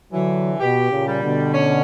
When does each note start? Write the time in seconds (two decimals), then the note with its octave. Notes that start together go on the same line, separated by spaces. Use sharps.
0.13 D3 E3 F#3
0.60 B2 G4
0.91 A#2 C#3
1.06 G3
1.23 B2 D3
1.54 C#4